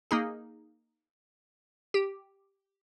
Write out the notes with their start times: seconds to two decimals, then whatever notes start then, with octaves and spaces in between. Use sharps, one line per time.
0.11 A#3 D#4 G#4
1.94 G4